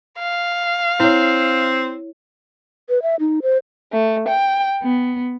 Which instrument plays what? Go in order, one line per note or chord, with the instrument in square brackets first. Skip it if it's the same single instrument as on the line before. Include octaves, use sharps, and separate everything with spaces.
[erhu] F5
[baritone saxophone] C4 [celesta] E4 C#5
[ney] B4
E5
D#4
C5
[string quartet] A3
G5
B3